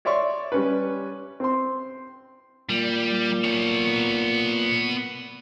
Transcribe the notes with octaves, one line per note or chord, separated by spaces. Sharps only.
C#5 D5 E5 C6 C#6
G3 C#4 B4
C4 C6
A#2 G3
B3 C#5